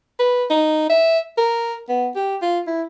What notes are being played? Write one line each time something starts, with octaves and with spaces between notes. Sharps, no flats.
B4
D#4
E5
A#4
B3
G4
F4
E4